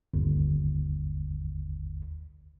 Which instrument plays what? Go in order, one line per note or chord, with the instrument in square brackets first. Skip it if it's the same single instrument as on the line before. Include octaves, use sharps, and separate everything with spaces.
[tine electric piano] G1 D#2